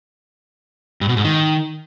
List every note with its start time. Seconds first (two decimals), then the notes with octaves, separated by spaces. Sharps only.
1.01 G2
1.09 B2
1.17 G#2
1.24 D#3